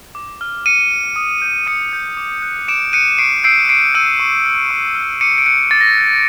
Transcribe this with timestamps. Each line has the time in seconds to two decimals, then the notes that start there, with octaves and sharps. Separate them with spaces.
0.15 D6
0.41 F6
0.66 D6 C#7 D#7
0.92 F6
1.16 D#6
1.42 G6
1.67 D#6 C#7 D#7
1.93 G6
2.17 D6
2.42 F#6
2.68 D6 D7 E7
2.93 F#6 C#7 D#7
3.18 C#6 C7 D7
3.44 E6 G6 C7 D7
3.69 C#6 C7 D7
3.94 E6 G6 C#7 D#7
4.20 C#6
4.45 F6
4.71 C#6
4.95 F6
5.21 D6 C#7 D#7
5.38 D7
5.46 F#6 C#7 D#7
5.71 D6 A6
5.81 A#6
5.90 A6
5.97 F#6